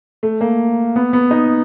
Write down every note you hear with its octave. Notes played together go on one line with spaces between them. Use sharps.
A3
A#3
B3
B3
D#4